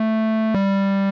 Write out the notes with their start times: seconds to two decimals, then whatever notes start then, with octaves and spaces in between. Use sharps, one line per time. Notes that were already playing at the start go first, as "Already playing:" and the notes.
Already playing: A3
0.54 G3